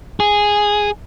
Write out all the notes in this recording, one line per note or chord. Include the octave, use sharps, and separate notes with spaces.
G#4